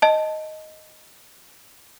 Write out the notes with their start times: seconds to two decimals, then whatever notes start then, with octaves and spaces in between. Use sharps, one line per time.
0.02 D#5 A5